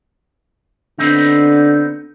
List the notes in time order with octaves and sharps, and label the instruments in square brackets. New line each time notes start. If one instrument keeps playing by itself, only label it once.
[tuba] D3 [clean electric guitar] B3 C4 D#4